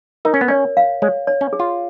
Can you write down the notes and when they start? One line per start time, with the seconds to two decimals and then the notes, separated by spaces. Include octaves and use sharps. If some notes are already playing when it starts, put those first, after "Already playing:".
0.25 D#4 A#4
0.34 C#4
0.41 B3
0.48 C#4 C#5
0.77 F5
1.02 G#3 C#5
1.27 C#5
1.41 C#4
1.53 G#4
1.60 F4